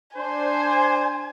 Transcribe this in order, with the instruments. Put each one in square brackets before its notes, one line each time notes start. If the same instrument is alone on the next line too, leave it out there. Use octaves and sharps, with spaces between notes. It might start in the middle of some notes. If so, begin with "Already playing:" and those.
[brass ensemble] D4 C5 [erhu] G#5